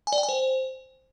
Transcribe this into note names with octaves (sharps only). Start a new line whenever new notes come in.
G#5
D5
G5
G#5
C5